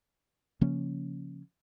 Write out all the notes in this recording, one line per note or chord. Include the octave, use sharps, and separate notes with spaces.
C#3 F3 A#3 C#4